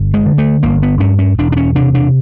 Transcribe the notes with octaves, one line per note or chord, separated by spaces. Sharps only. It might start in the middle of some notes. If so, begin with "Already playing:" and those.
Already playing: G1
G#3
D3
A3
G1 A#3
B3
G2 C#4
C#4
E1 D4
D4
C#4
C3 D4
D4